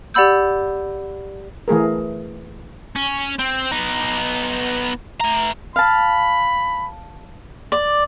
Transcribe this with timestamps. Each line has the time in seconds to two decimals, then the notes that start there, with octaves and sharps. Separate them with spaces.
0.14 G4 D5 F#5 B5 E6 G6
1.68 E3 A3 G#4 A#4
2.96 C#4
3.39 C4
3.72 B3 D#4
5.20 A3 A#5
5.76 F5 A5 B5
7.72 D5